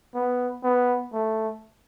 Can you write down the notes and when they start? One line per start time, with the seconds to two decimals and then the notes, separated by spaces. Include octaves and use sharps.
0.15 B3
0.63 B3
1.13 A3